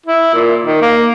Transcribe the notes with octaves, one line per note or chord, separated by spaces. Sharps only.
E4
A#2
D#3
A#3